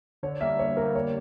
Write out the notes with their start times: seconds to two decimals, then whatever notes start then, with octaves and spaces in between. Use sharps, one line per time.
0.23 D3 C#5
0.41 G3 A#3 E5
0.59 D3 C#5
0.77 G3 A#3 A#4
0.95 D3 C#5